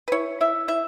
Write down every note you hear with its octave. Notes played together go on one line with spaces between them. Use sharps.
B4
E4 C#5
E4 E5
E4 E5